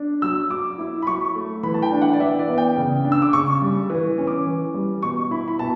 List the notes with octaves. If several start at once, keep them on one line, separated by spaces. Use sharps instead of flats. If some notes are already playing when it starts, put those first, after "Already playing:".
Already playing: D4
F#3 E6
F#3 D6
E4
B5
F#3 C#6
A3
E3 B5
A5
G5
D4
F#5
D5
E3 E5
D5
B3
G5
C#3
D4
E6
D6
C#3 C#6
G3
E3
C#4
D6
E3
G3
B2 C#6
E4 B5
B5
B2 A5